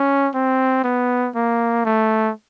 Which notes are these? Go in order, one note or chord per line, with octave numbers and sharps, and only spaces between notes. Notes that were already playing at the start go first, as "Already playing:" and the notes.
Already playing: C#4
C4
B3
A#3
A3